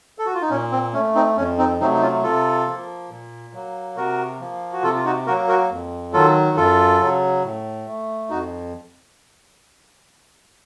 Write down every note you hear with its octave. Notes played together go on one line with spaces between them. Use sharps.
A4
F#4
F4
D#4
A#2 C#4
C4
A3 C#4
C4 D#4
F2 C#4
C4 D#4
C3 F#3 A3 C4 D#4
D#4
C#4 F4
C3 F4 A4
F3 A#3
A#2
F#3 A#3
C3 F#4 A#4
F3 A#3
F#4
C3 F4 A4
F4
D#4 F#4
F#3 A#3 F#4 A#4
F#4 A#4
F2
D#3 F#3 F4 A4
F#2 F4 A4
C#3 F#3
A2
A3
F2 D#4 F#4